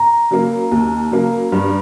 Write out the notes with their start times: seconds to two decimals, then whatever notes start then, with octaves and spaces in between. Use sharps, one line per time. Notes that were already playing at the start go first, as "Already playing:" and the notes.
Already playing: A#5
0.31 C#3 F#3 A#3
0.71 D#2
1.11 C#3 F#3 A#3
1.52 G2